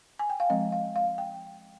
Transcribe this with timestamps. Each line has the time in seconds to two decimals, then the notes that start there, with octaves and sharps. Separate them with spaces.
0.19 G#5
0.30 G5
0.40 F5
0.50 F3 G#3 C4 D#5
0.72 F5
0.96 F5
1.18 G5